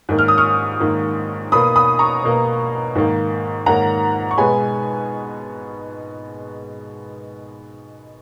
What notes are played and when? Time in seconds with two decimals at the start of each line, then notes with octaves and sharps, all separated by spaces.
0.09 G#2 D#3 A#3
0.19 F6
0.28 D#6
0.38 C#6 F6
0.80 G#2 D#3 A#3
1.52 B2 A#3 B5 D#6
1.76 B5 D#6
1.99 A#5 C#6
2.24 B2 A#3
2.95 G#2 D#3 A#3
3.66 G#2 D#3 A#3 F#5 A#5
4.31 C#6
4.38 B2 G#3 B3 G#5 B5